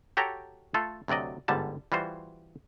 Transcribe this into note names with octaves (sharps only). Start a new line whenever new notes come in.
F#4 G4 A4 C#5 G5 A#5
A3 F4 A4
D2 C3 F#3 D5 D#5
G1 G#2 D3 G3 A5
E3 G3 F4 F#4 C5